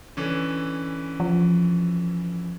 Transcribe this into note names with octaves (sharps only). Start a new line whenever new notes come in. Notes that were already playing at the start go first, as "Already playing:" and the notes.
D3 E3 C#4
F3